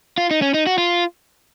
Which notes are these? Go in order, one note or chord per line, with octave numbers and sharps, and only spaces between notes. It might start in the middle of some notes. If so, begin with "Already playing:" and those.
F4
D#4
C#4
D#4
F#4
F4